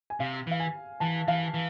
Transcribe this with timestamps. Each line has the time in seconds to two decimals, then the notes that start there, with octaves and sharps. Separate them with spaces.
0.10 G#5
0.20 C3 F5
0.47 E3 F5
0.60 G#5
1.00 E3 A5
1.28 E3 F5
1.54 E3